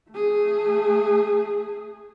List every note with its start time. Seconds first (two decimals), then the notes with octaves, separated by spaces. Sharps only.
0.11 A3 G#4